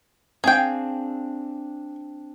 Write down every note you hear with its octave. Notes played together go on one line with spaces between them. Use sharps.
C4 D4 G#4 F5 G5